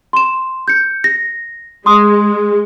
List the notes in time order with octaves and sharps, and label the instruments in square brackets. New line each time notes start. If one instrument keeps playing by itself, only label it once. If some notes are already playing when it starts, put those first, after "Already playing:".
[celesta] C6 E7
G6 C#7
A#6
[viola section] G#3 [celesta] C6 D#6